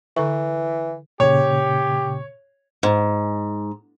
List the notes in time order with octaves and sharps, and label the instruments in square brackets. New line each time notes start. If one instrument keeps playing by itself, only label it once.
[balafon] D3 B4 C#6 [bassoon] E3
[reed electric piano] A#2 C#3 [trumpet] G4 [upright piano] C#5
[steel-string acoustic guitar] G#2